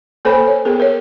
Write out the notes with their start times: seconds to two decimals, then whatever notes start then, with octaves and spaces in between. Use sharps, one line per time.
0.25 A#3 A4 C5 C#5 G#5 B5
0.47 C#5
0.65 B3 G#4 A#4
0.80 A#4 C#5